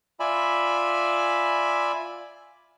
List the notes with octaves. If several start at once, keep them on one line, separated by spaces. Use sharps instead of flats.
F4 D5 E5 G#5 B5